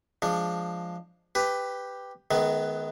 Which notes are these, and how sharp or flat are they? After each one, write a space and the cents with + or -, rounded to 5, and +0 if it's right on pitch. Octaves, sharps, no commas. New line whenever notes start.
F3 +0 G#3 +0 D4 +0
G4 +5 B4 +10
D#3 +0 G#3 +40 B3 +0